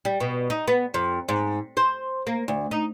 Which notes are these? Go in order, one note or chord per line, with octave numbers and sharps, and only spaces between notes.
G3
B2
D#4
B3
F2
G#2
C5
A#3
D2
D#4